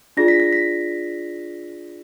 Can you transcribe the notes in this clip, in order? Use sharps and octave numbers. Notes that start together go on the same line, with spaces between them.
D4 F4 G#4 D5 A#6
B6
A#6
B6